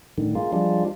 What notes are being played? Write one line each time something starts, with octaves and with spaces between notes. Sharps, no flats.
A2 D3 D#3
G#3 A#3 F4
F3 G3 G#3 D4 F4